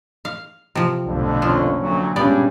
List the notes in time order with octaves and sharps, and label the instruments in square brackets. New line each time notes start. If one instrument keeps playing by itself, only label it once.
[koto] F5
C3 F3
[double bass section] B1 A2 [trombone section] F2 D3
[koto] F3 F4 [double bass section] A#3 C4 C#4
[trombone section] D2 F#3
[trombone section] G2 [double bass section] A#2 G#3 C#4 [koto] B3 D5